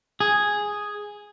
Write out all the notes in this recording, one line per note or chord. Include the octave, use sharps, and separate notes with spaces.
G#4